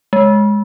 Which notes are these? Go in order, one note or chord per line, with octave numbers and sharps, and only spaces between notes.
G#3